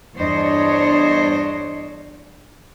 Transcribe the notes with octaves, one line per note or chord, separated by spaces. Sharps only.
E2 G2 D4 C5 C#5 D#5